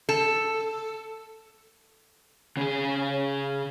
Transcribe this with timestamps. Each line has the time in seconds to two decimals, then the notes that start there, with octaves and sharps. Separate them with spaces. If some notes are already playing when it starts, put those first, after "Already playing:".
0.09 A4
2.57 C#3 G#4